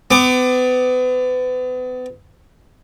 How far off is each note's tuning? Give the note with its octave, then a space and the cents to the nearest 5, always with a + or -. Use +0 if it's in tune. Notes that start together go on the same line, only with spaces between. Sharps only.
B3 +35 D6 +30